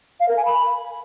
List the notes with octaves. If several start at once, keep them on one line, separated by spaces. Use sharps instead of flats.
F5
A#4
G#5
B5